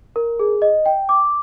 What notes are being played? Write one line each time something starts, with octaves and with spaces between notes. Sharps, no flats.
A#4
G#4
D#5
G5
D6